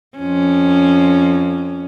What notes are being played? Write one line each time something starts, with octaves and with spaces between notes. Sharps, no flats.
F2 C#4